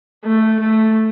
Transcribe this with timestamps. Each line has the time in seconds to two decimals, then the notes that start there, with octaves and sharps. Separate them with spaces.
0.24 A3
0.60 A3